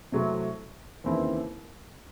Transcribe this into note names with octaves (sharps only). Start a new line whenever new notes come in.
C3 F#3 A3 C4 E4
D#2 C#3 E3 C4 E4